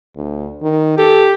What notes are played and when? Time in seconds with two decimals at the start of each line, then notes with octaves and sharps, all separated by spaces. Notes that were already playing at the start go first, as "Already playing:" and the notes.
0.16 D2
0.62 D#3
0.98 G4 A4